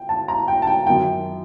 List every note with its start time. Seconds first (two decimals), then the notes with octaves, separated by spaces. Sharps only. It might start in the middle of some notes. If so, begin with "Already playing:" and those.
Already playing: G5
0.09 A5
0.28 A#5
0.48 G5
0.62 A5
0.67 G5
0.87 F#2 D#3 G5